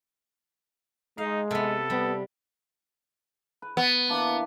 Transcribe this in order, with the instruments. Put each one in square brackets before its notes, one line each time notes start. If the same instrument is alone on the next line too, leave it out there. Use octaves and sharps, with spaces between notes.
[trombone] G#3 [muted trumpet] D#4 [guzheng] F5
[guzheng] C3 B3 [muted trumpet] A4
[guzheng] G3 [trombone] B3
[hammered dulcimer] B4
[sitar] B3
[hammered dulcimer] E3 A#3 D4